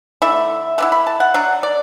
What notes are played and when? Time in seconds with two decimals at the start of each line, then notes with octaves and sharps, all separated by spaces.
0.22 D3 A3 E4 E5
0.78 D3 B3 E4 F#5
0.92 B5
1.07 A5
1.20 F#5
1.34 F#3 D4 F#5
1.63 D5